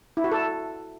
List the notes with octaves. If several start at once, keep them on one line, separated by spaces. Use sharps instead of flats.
E4
F#4
A4